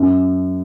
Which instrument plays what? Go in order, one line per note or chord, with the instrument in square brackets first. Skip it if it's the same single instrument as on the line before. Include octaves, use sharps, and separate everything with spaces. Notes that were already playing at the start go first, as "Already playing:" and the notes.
Already playing: [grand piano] F#2